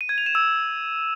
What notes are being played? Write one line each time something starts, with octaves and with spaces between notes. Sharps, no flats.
D#7
G#6
F7
E7
E6